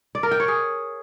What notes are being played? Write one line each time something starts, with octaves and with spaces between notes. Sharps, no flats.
D5
A#4
G5
C#5
G#4